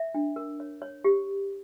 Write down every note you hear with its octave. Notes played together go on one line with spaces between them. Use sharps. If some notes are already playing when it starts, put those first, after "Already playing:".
Already playing: E5
D4
A#4
C#5
C#5
G4